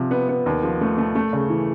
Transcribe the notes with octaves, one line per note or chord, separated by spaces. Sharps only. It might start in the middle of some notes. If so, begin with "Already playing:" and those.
Already playing: C3 F3
B3
B3
D#2
F3
A3
A3
A3
C#3
E3